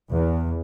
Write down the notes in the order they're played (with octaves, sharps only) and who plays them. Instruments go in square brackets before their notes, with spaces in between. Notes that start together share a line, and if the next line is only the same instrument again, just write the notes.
[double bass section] E2